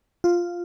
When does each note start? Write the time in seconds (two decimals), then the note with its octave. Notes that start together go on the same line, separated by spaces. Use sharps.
0.24 F4